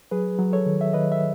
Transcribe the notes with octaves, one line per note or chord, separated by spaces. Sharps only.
F#3 G#4 B4
F#3
A4 C#5
D#3
E5
D#3 B4 D#5
E5